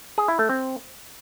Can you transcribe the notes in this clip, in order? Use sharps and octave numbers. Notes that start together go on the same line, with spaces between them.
G#4
E4
A3
C4